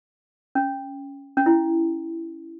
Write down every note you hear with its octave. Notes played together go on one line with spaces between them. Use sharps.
C#4
C#4
E4